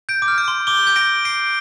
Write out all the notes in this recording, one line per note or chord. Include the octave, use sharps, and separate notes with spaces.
G6 D7
D6
F6
G6
C6
D6 G7
G6
A#6 D7
C7 D7